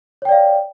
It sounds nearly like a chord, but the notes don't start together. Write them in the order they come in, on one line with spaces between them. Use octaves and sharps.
C#5 G5 D5 F5